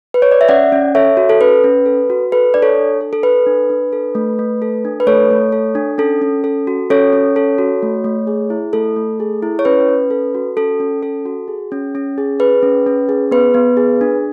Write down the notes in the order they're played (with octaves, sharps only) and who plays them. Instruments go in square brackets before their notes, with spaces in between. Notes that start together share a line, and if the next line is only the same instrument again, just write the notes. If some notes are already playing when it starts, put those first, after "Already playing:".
[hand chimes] B4
C#5
D5
E5
C#4 D5 F#5
C#4
A4 C#5 E5
F#4
A4
C#4 B4
C#4
A4
F#4
A4 B4
D4 D5
A4 C#5
D4
A4
A4
A4 B4
D4
D4
A4
A3
A3
A4
D4
B4
A3 A4 C#5
A3
A4
D4
C#4 A4
C#4
A4
F#4
C#4 A4 C#5
C#4
A4
F#4
A3
A3
G#4
E4
A3 A4
A3
G#4
E4
C#5
C#4 B4
C#4
A4
F#4
C#4 A4
C#4
A4
F#4
G#4
C#4
C#4
G#4
G#4 B4
C#4
C#4
G#4
B3 B4
B3
G#4
D4